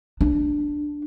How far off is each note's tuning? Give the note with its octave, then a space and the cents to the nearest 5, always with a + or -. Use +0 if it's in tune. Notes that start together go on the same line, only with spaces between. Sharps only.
D4 +5